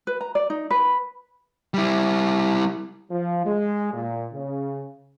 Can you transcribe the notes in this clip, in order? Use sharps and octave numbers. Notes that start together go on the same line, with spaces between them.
B4
A#5
D5
D#4
B4
G3 E4
F3
G#3
A#2
C#3